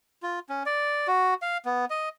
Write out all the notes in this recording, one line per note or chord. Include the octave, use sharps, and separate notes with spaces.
F4
C#4
D5
F#4
F5
B3
D#5